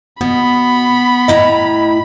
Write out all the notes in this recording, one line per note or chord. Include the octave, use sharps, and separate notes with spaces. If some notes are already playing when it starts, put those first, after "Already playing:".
B2 B3 B5
A2 E4 D#5 A#5